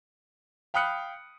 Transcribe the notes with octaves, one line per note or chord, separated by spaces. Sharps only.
F5 G5 B5 D#6 F#6 C#7